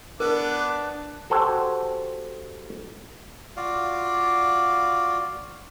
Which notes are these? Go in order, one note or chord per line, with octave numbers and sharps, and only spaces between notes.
B3 D4 A#4 D6 F#6
F#4 G4 A4 C5 F#5 G#5
F4 F#4 D5 F5